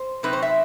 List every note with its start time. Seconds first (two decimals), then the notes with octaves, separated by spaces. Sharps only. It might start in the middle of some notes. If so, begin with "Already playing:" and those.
Already playing: C5
0.23 C3 F#3 C4 D#4 B4
0.33 C5
0.42 E5